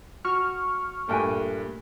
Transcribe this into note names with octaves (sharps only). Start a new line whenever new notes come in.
F#4 C#6 F6
G2 A#2 A3 A#4 G5 G#5